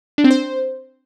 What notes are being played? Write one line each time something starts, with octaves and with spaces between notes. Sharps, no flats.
D4
C4
C5